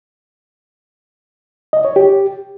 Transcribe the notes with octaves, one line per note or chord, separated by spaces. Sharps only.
D#5
C#5
G4